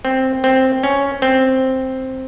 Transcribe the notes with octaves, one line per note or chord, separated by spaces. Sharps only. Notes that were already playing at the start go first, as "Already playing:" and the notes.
C4
C4
C#4
C4